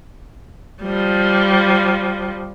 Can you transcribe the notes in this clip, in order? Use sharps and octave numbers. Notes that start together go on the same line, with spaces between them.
F3 G3